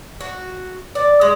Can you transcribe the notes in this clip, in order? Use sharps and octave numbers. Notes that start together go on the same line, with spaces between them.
F#4
D5
G#3